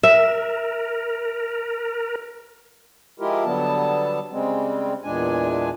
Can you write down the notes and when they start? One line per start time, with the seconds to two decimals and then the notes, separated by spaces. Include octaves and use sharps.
0.03 A#4 E5
3.20 F3 G#3 E4 F4 G4 A#4
3.45 D3 F#3 G3 B3 A5
4.32 C#3 G3 G#3 C4
5.04 E2 A#2 G#3 D4 G#5